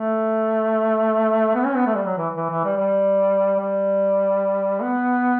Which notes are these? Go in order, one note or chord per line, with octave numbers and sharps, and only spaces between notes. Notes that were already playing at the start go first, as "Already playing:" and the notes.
Already playing: A3
B3
C#4
B3
A3
G3
F#3
E3
E3
E3
G3
G3
G3
B3